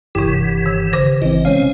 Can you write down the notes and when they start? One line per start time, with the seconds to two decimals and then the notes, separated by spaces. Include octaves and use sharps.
0.15 F#1 G2 C3 E3 E4 G4
0.66 D#3
0.93 C#3 C5 A#6
1.22 G#1 E3 C4 D#5
1.45 C3 G#3 C4 C#4 F5